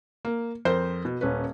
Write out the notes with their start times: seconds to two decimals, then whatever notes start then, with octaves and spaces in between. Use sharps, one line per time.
0.25 A#3
0.65 F2 A#4 C5 G6
1.05 B2
1.21 D#1 C#4 B4